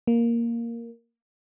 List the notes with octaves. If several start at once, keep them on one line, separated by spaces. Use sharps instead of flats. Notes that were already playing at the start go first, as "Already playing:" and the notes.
A#3